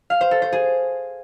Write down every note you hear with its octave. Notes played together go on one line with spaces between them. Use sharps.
F5
C5
A4
C5
G#4